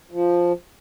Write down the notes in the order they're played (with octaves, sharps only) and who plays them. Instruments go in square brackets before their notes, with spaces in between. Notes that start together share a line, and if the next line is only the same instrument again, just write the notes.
[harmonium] F3